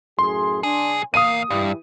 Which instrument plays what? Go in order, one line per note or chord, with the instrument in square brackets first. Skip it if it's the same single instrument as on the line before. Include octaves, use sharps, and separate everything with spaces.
[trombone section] F#2 A2 G#4 [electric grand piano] C6
[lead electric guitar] B1 G#4 [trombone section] D4
[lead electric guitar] E2 F5 [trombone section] A#3 [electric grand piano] D#6 D#7
[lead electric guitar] G2 [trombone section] E3 G4